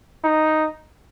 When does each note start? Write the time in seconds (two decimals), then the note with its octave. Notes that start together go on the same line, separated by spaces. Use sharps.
0.24 D#4